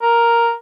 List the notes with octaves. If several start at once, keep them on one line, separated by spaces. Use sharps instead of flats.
A#4